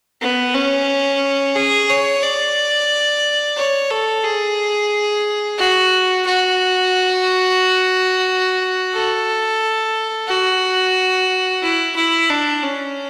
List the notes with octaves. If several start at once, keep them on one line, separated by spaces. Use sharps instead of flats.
B3
C#4
G#4
C#5
D5
C#5
A4
G#4
F#4
F#4
A4
F#4
E4
E4
D4
C#4